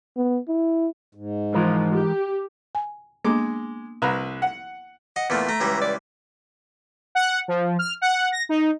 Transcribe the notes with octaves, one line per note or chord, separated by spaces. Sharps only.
B3
E4
G#2
E3 F3 G#3 A#4
G4
G#5
G#3 A#3 B3 D4 D6
C2 B4 A#5
F#5
D#5 F#5
E2 A#2 A3
A3 A#5
C#2 E3 G3
D5
F#5
F3
F6
F#5
A#6
D#4